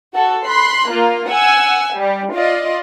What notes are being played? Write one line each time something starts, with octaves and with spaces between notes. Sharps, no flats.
F#4 A4
B5 C6 F#6
A#3 F4
F#5 G#5 E6
G3
F4 D5 D#5